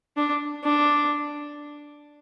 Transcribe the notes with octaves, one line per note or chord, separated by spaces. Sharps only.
D4
D4